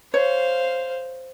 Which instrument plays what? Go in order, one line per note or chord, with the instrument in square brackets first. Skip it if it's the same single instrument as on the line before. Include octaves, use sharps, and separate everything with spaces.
[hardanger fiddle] C5 F5 [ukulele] C#5